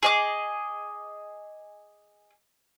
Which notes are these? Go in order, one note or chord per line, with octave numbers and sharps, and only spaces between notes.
G#4 D#5 D6